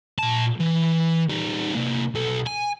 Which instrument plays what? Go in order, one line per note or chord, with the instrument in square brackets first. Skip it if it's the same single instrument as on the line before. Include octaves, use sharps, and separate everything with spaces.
[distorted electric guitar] A#2 A5
E3
G3 D#4
C3 A#3
B1 A4
G#5